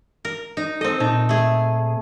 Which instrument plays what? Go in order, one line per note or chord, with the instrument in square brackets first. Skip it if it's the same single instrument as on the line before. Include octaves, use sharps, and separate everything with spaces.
[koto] A#4
D#4
[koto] C4 D#5 [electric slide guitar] A4 C5
[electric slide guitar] A#2 A5 [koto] D#4
[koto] A3 G#4